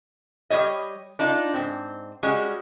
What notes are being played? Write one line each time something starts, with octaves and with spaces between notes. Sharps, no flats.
G3 G4 C#5 D#5
D4 D#4 F4
G#2 C4
G3 G#3 C#4 F#4